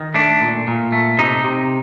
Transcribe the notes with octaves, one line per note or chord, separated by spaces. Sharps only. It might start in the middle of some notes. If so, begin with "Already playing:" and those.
Already playing: D#3
A3 D4
A#2
A#2
A3
C3 D#4
C3